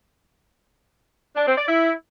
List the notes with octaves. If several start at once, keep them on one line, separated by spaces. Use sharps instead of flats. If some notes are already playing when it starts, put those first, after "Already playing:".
D4
C4
D5
E4